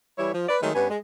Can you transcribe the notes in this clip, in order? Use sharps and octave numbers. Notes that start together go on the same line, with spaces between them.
E3 G3 E4 C#5
F3
B4 D5
D#3 F#3 G#3 A3
G2 B3 C#4 B4
G#3